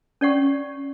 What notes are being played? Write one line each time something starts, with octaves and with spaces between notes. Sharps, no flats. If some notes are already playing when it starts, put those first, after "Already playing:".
C#4 D5 F#5 C#6